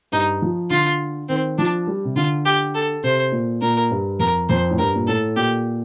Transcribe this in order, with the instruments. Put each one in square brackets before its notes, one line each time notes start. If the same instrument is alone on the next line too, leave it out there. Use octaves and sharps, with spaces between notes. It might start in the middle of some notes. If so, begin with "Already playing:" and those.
[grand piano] G2 [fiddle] D#4
[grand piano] F3
[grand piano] D3 [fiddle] F4
[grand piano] D#3 [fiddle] C4
[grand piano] F3 [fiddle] D4
[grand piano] G3
C3
[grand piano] D3 [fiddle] F4
[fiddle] G4
A4
[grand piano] C3 [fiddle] C5
[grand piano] A#2
[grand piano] A#2 [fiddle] A#4
[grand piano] G2
[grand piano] F2 [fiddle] A#4
[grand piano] F2 [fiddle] C5
[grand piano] A2
[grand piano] G2 [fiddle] A#4
[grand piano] A#2
[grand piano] A2 [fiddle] A4
[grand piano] A#2 [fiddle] G4